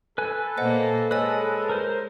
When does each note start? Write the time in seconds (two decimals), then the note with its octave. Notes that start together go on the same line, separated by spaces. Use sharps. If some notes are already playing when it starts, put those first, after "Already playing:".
0.18 A4 B4 G#5
0.58 A#2 A#3 C5 D#5 F#5
1.11 G#3 B4 C#5 D#5 G#5
1.69 A#4 C5